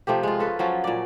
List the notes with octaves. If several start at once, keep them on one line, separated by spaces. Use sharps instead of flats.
C3 F3 A3 G4
G#3 F4
C#4 A4 B4
F3 F#3 C#4
A#2 D5